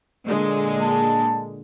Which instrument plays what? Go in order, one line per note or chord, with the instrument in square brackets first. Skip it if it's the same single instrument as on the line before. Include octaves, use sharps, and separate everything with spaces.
[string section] A#2 D3 G#3
[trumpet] A5